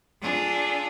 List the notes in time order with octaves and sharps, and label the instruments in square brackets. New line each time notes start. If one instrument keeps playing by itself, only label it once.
[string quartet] D4 F4 G#4 A4